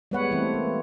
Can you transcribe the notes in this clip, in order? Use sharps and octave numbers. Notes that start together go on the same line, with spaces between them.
G3 G#3 B3 B4 C#5 F#5
E3 G3 A3 C4
A#3